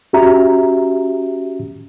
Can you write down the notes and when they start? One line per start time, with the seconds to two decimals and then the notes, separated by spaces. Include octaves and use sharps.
0.13 C#4 F#4 G4 E5 A#5